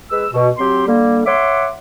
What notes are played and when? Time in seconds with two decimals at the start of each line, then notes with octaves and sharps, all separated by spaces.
0.10 G#3 B4 E6
0.32 B2
0.58 F#3 C4 G4 C6
0.86 D3 G3 A#3
1.25 C#5 E5 F#5 C6 D6